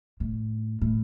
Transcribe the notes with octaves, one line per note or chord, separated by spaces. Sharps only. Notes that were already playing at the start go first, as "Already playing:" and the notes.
A2
A2